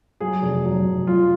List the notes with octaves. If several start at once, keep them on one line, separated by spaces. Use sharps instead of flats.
F#3 G#4
F1
F#3
F1
F#3 F4